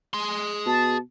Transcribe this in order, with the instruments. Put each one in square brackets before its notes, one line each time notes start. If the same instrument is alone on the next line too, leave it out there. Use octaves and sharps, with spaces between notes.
[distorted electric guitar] G#4 C6
[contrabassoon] B2 [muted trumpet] A5